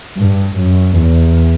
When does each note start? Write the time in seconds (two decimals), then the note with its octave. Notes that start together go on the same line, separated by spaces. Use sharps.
0.18 G2
0.58 F#2
0.97 E2